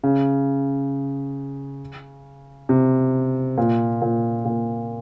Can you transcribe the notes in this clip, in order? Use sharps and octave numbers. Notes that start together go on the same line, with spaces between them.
C#3
C3
A#2
A#2
A#2